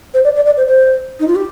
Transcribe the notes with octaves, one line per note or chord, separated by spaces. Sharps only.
C5
D5
D5
D5
C5
C5
D#4
F4
G4